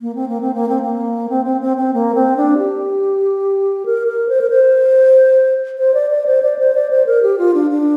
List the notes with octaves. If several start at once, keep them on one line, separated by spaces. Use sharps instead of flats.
A#3
C4
A#3
C4
A#3
C4
A#3
C4
C4
C4
C4
A#3
C4
D4
G4
A#4
A#4
C5
A#4
C5
C5
D5
D5
C5
D5
C5
D5
C5
A#4
G4
F4
D4
D4